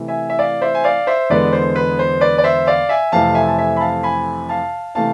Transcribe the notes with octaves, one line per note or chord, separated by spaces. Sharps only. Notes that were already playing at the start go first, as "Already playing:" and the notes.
Already playing: C3 E3 A3
E5 G#5
E5
D5 F5
C5 E5
G#5
D5 F5
C5 E5
E2 D3 G#3 B3 B4 D5
C5
B4
C5
B4 D5
D5
C5 E5
D5 F5
E5 G#5
F2 C3 E3 A3 C4 F5 A5
E5 G#5
A5
E5 G#5
B5
F5 A5
G#5 B5
F5 A5
C3 E3 A3 F5 A5